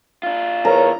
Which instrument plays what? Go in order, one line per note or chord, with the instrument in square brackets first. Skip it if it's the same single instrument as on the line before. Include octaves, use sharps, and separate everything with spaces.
[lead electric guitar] D4 F4
[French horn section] E2 B4 C#5 [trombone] A#4 [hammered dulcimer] A#5